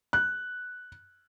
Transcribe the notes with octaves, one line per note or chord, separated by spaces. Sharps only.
F#6